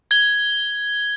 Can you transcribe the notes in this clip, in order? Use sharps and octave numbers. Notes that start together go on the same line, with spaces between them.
G#6 G7